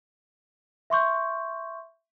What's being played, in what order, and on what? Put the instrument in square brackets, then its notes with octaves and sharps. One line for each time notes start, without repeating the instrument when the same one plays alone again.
[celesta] E5 C6 C#6 G6